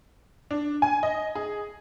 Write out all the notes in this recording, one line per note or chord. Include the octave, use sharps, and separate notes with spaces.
D4
G#5
D#5
G#4